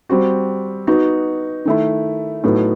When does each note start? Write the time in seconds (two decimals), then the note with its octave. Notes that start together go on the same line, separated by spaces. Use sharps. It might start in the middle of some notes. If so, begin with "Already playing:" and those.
0.09 G3 C4 F#4
0.87 B3 D#4 F#4
1.65 D#3 A3 E4
2.44 A2 F#3 B3 D#4 A4